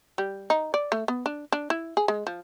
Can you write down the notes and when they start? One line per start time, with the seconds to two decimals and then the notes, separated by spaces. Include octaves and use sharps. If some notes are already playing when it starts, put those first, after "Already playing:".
0.18 G3
0.50 D#4
0.74 D5
0.92 A3
1.08 B3
1.26 D4
1.52 D4
1.70 E4
1.97 G#4
2.08 G#3
2.27 F3